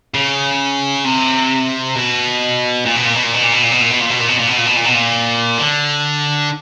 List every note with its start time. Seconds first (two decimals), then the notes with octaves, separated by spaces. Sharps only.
0.14 C#3
1.04 C3
1.95 B2
2.86 A#2
2.96 B2
3.05 A#2
3.14 B2
3.23 A#2
3.33 B2
3.42 A#2
3.52 B2
3.62 A#2
3.71 B2
3.81 A#2
3.90 B2
4.00 A#2
4.10 B2
4.19 A#2
4.28 B2
4.38 A#2
4.47 B2
4.57 A#2
4.66 B2
4.76 A#2
4.85 B2
4.94 A#2
5.58 D3